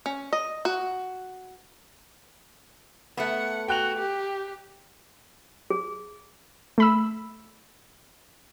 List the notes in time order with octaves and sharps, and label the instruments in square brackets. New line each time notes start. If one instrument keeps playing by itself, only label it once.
[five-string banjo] C#4
D#5
F#4
[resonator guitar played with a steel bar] A3 B3 [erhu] F#5
[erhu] F#4 [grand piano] G5 F#6 F7
[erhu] G4
[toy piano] G#4
[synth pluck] A3 B5 E6